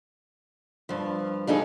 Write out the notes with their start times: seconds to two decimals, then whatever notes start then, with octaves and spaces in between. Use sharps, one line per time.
0.89 G2 F3
1.47 F3 G3 D4 D#4 G#4 A4